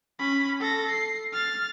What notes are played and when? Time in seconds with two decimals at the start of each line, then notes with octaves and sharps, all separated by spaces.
0.19 C#4 B5
0.60 A4 A#6
0.90 C7
1.33 F6 A6